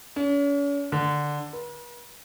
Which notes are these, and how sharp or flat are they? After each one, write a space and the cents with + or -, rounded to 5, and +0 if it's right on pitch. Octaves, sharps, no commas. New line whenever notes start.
C#4 +40
D3 +5
B4 -45